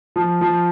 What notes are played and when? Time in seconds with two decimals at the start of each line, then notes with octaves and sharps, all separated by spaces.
0.16 F3
0.41 F3